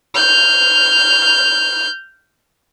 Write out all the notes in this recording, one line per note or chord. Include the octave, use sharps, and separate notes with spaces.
F6 G6